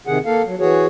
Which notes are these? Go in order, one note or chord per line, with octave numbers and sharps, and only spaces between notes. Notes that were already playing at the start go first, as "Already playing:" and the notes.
C3 D#3 G#4 F#5
A#3 A4 F5
F#3
E3 F#4 G#4 C#5